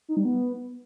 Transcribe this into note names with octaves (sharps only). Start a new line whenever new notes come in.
D#4
G3
B3